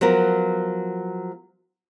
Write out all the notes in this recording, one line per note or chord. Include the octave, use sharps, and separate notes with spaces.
F3 F#3 B3 A#4